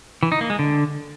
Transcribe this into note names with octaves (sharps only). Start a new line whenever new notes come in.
E3
D#4
A#3
G#3
D3